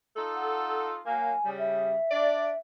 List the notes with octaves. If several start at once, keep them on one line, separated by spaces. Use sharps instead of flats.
D#4 F4 A4
F#5
F#3 A#3 G#5
C#3 G3
E5
D4 D5